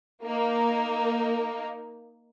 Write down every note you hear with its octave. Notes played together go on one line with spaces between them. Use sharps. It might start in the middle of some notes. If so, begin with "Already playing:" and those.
A#3 D#4